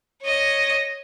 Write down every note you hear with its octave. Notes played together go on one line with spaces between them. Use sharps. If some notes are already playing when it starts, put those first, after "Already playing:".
C#5 D#5